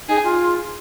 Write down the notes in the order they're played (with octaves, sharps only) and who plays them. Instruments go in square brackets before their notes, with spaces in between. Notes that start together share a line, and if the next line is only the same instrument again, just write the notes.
[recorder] D#4 [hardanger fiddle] G#4
[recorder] F4